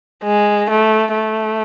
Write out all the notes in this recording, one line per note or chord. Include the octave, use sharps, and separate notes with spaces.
G#3
A3
A3